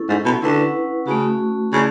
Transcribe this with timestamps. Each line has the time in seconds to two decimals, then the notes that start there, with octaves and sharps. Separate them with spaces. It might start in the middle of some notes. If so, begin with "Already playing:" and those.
Already playing: C#4 E4 A4
0.09 G#2
0.25 B2
0.42 D3 C#4 E4 B4 F#5
1.07 C#3 A3 C#4 F#4
1.73 C#3 A3 C#4 E4 G#4 D5